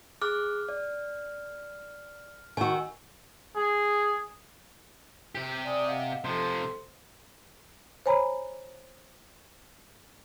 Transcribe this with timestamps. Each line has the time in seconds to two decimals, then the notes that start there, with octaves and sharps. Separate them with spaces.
0.21 G#4 D6 F6 F#6
0.69 D5
2.57 D#3 F#4 G#5 E6
3.56 G#4
5.35 C3 G4
5.65 D5 G#5 D#6
5.86 D#5 F5 F#5
6.24 C3 F3 A4 C5 C6
8.06 C5 C#5 G#5 A#5 B5